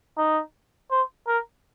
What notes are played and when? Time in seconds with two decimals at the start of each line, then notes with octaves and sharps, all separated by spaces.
0.18 D#4
0.90 C5
1.27 A#4